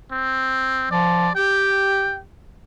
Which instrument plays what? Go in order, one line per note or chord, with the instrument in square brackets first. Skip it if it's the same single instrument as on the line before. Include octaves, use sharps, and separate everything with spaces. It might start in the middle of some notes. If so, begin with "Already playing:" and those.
[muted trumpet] C4
[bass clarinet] F3 [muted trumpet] D5
[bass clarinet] G4 [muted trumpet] G5